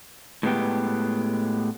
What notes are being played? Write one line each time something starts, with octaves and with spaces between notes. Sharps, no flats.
A2 G#3 B3 G4